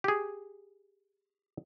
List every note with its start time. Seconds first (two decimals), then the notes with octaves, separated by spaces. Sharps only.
0.04 G4 G#4